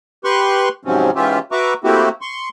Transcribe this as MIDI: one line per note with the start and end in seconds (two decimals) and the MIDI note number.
0.24 0.69 67
0.24 0.69 71
0.24 0.69 84
0.24 0.69 85
0.24 0.69 90
0.85 1.11 44
0.85 1.11 48
0.85 1.11 53
0.85 1.11 54
0.85 1.11 60
0.85 1.11 61
1.15 1.39 44
1.15 1.39 52
1.15 1.39 61
1.15 1.39 65
1.15 1.39 67
1.15 1.39 76
1.52 1.74 66
1.52 1.74 71
1.52 1.74 76
1.52 1.74 82
1.52 1.74 85
1.52 1.74 86
1.84 2.09 57
1.84 2.09 58
1.84 2.09 60
1.84 2.09 64
1.84 2.09 66
1.84 2.09 67
2.21 2.49 84
2.21 2.49 85